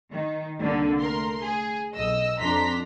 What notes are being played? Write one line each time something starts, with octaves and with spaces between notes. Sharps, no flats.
D#3
C2 D3 A#3
A3 A#4 C6
G#4
B1 D#5 E6
F2 D4 A#5 C6 B6